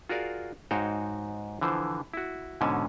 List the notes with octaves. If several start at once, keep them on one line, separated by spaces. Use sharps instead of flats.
F4 F#4 G#4 A#4 D5 F5
G#2 D#4 F#4 C#5 F5 G5
D3 E3 F3 C5
E4 F#4
G#2 B2 D3 C#4 G#5 A5